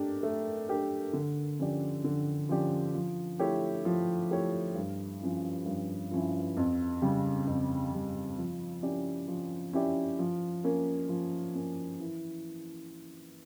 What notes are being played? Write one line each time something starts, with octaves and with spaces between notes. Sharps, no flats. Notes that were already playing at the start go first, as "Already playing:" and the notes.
Already playing: A3 D4 G4 A#4
A3
D4 G4 A#4
D3
F3 C#4 G4 D5
D3
F3 C#4 G4 D5
F3
A3 E4 G4 C#5
F3
A3 E4 G4 C#5
G2
F3 C#4 E4
G2
F3 C#4 E4
F2
C#3 G3
F2
C#3 G3
F3
C#4 E4 G4 D5
F3
C#4 E4 G4 D5
F3
A#3 C#4
F3
A#3 C#4
E3